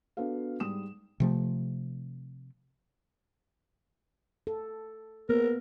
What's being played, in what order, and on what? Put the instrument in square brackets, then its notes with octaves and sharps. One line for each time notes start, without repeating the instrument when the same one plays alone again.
[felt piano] B3 D4 F#4 A4 F5
G#2 G3 D#6 E7
[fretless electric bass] C3 F3 A3
[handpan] A4
[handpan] A#3 B3 [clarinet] A#4